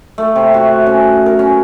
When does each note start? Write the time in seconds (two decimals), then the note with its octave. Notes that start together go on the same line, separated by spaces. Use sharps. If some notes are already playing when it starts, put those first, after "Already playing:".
0.18 A3
0.36 C3
0.54 F#4
0.86 C#4
1.26 A#4
1.39 C#4